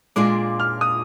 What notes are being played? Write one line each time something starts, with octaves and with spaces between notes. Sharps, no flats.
A#2 G#3 D4 F4 D6
F6
D#6